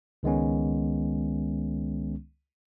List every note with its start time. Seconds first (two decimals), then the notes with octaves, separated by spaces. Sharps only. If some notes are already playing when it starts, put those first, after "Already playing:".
0.23 C#2 D#3 G#3 B3 C#4